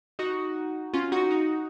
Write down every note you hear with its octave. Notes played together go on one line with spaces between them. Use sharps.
D#4 F#4
C#4 F4
D#4 F#4
D#4 F#4